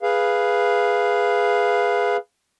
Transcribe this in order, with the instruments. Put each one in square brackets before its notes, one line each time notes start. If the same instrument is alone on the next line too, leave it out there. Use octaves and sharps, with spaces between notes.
[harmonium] G#4 B4 F5